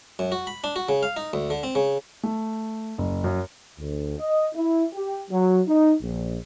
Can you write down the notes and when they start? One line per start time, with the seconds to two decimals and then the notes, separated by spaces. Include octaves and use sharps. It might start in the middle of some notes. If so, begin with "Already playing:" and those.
0.19 F#2
0.32 F#4
0.47 B5
0.64 D4
0.76 F#4
0.89 C#3
1.03 F5
1.16 D#4
1.33 D2
1.50 D3
1.63 C4
1.75 C#3
2.23 A3
2.98 F#1
3.24 F#2
3.79 D2
4.19 D#5
4.55 E4
4.93 G4
5.31 F#3
5.68 D#4
6.02 A#1